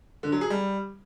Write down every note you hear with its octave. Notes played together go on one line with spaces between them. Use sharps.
D3
F#3
G#4
G3